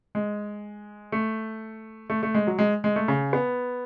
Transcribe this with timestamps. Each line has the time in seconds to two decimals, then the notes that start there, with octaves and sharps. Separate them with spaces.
0.15 G#3
1.12 A3
2.10 A3
2.23 A3
2.34 G#3
2.47 F#3
2.59 G#3
2.84 G#3
2.96 A3
3.08 C#3
3.33 B3